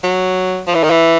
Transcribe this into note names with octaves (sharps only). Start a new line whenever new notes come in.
F#3
F3
E3
D#3
E3